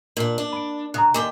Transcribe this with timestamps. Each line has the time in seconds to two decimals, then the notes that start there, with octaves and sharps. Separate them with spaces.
0.17 A#2 D4
0.38 D4
0.53 B5 D7
0.94 C#3 A#5 D#6 F#6
1.14 D#2 D3 G5 G#5 D6